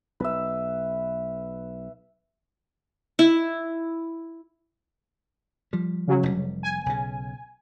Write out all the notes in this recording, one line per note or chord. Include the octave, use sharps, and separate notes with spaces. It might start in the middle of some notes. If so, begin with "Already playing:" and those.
B1 B4 E5
E4
F3 G3
C#3 F#3
F1 A#2 G3
G#5
B1 C#3